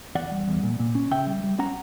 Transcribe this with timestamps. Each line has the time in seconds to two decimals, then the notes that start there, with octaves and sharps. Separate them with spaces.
0.15 E2 D5 F#5
0.32 G3
0.47 E2
0.63 A#2
0.79 A#2
0.95 C#4
1.11 C#3 E5 G5
1.27 G3
1.44 G3
1.59 C#4 F#5 A#5